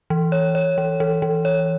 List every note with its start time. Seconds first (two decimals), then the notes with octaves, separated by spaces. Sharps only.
0.10 E3
0.32 C#5
0.55 C#5
0.78 E3
1.00 E3
1.22 E3
1.45 C#5